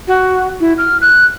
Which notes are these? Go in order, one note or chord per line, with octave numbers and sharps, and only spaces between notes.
F#4
E4
F6
F#6